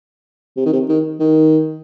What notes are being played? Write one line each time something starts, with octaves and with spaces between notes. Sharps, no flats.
C3
D#3
C3
D#3
D#3